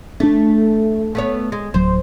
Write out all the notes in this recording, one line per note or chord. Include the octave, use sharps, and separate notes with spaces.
A3 C#4 D4
A3 B3 C#5
G#3
D1 F#3 C5